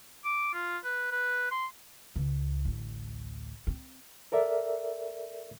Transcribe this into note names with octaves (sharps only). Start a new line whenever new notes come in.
D6
F4
B4
B4
C6
C#2 C4
A1 D2
C4
A4 A#4 D5 E5